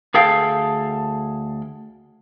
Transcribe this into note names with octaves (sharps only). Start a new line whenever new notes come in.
D2 G#4 A4 F5 G5